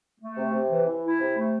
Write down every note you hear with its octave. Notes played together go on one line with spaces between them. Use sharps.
A3
C3
C3
E3
E3
E4
C3
A3